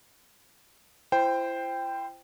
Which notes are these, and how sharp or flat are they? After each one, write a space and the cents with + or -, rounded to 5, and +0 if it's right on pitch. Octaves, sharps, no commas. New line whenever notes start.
E4 +40 C5 -5 G5 +5